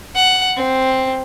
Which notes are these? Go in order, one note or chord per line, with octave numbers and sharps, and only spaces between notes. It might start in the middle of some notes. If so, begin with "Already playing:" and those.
F#5
C4